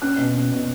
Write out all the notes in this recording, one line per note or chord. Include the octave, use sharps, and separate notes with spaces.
C#4 F#6
B2
C#4
B2